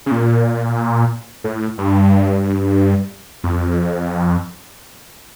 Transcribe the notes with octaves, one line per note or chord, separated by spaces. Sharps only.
C#3
A#2
A2
G2
F2